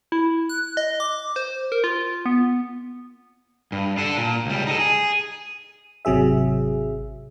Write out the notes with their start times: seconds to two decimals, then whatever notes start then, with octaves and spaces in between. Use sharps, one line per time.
0.12 E4
0.49 F#6
0.77 D#5
1.00 D6
1.36 C5
1.72 A#4
1.84 F4
2.26 B3
3.72 G2
3.97 D4 A4
4.18 A#2
4.46 C#2 G3
4.67 D#4 A4
4.79 G#4
6.05 G#1 C3 F#3 G#4 E5